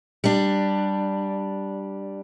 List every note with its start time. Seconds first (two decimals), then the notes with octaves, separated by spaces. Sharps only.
0.24 G3 D4